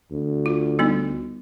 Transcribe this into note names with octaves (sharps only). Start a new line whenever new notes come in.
D2
F4
G3 B3 D#4